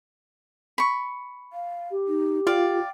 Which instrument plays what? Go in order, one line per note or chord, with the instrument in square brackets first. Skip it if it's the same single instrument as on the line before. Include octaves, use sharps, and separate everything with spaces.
[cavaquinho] B5 C#6
[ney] F5
[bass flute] G4
[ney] D#4
[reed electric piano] F4 [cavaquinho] D5 F5 [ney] G5